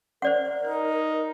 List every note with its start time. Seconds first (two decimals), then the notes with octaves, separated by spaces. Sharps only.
0.22 A#4 C5 D5 F#5
0.67 D#4